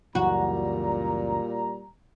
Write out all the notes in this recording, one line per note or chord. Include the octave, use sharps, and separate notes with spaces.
C#2 F#2 A#2 E3 G3 F#4 A#5